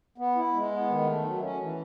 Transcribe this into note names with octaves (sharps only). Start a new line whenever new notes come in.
B3
E4
G#3
B3
D#3
A3
F#3
C#4
E3